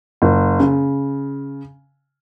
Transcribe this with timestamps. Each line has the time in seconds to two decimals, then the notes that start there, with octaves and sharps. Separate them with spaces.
0.22 F#1
0.60 C#3